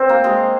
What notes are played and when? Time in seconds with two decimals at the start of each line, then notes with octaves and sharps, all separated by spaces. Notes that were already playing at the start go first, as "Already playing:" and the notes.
Already playing: C4
0.09 A#3
0.24 G#3